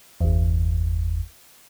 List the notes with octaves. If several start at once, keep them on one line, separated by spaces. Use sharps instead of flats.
G1 E2